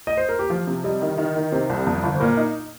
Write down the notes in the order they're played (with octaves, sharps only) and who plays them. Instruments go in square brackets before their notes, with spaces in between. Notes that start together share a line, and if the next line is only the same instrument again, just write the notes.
[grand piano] D#5
C5
A#4
G4
[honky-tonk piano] F3 [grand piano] F4
[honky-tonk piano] C3
[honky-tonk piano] G3 [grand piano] D#5
[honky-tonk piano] D#3
D#3
D#3
[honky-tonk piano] C3 [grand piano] C5
[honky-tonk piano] C2
F2
G1
[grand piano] C5
[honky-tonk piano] A#2 [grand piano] A#4
[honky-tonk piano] D#4